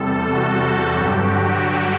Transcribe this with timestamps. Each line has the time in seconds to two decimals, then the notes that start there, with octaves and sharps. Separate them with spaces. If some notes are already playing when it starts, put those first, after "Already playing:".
Already playing: E2 C3 G3 A4
0.31 F#4
0.92 G2 D3 F#3 G4
1.23 F#4
1.54 F#4